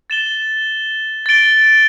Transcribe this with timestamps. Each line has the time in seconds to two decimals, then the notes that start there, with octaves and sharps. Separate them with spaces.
0.10 A6 E7 G7
1.26 A6 D7 G7